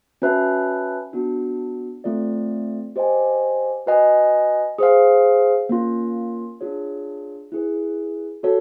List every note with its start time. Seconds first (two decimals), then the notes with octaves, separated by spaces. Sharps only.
0.22 C#4 F#4 B4 E5 A5
1.13 B3 D4 F#4
2.04 A3 C4 F4 A4 D5
2.96 G4 C5 D#5 G#5
3.86 F#4 B4 D#5 G#5
4.78 G#4 C5 F5
5.69 A#3 C#4 F4
6.61 D4 F4 G#4 C#5
7.52 E4 G#4 B4
8.43 F#4 A4 C#5